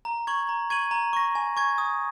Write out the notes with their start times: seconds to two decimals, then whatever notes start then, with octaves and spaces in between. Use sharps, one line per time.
0.05 A#5
0.27 C#6 G#6 F#7
0.49 A#5
0.70 C#6 G#6 D#7 F#7
0.91 A#5
1.13 C#6 A#6
1.35 G#5
1.57 C#6 G#6
1.78 D#6